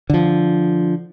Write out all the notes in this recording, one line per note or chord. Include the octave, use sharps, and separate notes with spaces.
D3 F3